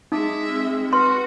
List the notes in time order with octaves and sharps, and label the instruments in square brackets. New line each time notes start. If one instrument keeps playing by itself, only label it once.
[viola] G#3 E5 [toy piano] D#4 [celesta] D6 D#6
[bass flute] C4
[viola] F#4 [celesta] B4 F6 [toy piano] C6